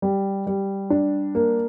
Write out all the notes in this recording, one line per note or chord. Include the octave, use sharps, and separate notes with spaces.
G3
G3
D4
A#3